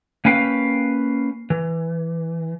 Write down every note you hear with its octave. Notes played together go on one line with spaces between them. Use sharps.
A#3 C#4 B4 F5 G5
E3